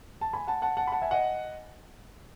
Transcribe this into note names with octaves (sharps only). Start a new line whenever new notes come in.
A5
G#5 B5
F#5 A5
F#5 A5
F#5 A5
B5
F#5 A5
E5 G#5
D#5 F#5